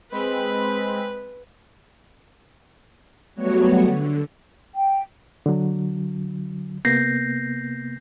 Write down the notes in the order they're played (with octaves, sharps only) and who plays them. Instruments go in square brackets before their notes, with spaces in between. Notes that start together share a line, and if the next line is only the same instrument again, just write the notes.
[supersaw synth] G#3 C4 B5 [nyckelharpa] B4
[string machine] F#3 G3 A3 B3 F#4 C#5
D3
[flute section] G5
[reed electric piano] D3 F#3
[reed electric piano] C3 A#3 B3 [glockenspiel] G6 A#6 C7